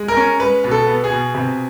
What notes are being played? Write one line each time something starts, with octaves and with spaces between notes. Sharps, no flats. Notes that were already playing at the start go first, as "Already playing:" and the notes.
Already playing: G#3
A#4
C#4
G#3 B4
B2
A4
B3
G#4
B2
C3